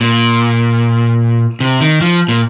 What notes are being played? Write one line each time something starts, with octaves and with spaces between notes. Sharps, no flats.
A#2
C3
D#3
F3
A#2